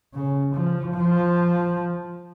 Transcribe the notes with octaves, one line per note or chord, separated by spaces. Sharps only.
C#3
F3
F3